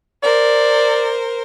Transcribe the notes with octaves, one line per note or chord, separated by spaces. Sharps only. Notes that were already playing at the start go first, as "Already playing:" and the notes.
A#4 C5 D5